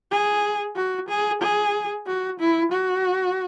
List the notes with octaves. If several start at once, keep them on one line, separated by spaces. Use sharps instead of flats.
G#4
F#4
G#4
G#4
F#4
E4
F#4